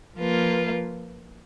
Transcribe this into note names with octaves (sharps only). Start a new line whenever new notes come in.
F3 A#3 F4 B4